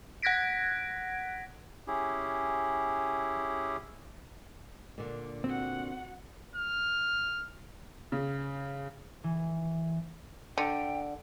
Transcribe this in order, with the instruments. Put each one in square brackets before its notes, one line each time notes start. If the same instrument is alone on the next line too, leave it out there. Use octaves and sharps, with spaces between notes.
[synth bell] F#5 F#6 G#6 A#6 B6 D7
[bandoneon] C#4 E4 G4 G#4
[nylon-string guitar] A#2 D3
[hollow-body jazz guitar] C4 [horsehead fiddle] F#4 F#5
[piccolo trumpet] F6
[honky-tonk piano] C#3
[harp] E3
[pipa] D3 [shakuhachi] G5